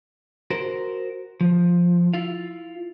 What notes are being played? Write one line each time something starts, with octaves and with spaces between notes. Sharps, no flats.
F#4 A#4 C5
F3
E4 F4 F5